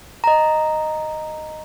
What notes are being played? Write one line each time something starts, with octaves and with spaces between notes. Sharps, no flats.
D#5 A#5